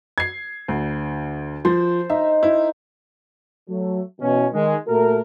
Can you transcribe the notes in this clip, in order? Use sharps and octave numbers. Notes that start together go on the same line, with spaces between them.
G#6 C7
D2
F3 C5
D#4 E5
E4
F#3 A3
B2 E3 C#4
D#3 G#3
A#2 A3 F#4 A#4